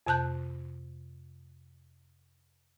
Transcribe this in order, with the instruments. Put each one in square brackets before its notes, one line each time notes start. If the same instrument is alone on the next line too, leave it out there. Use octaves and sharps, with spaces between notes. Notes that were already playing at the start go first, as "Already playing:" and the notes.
[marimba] F2 C3 A5 F#6 G6